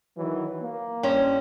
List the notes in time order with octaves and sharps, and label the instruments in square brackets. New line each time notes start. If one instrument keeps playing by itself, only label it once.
[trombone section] D#3 E3 F#3
A#3
[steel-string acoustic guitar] G2 C#4 C5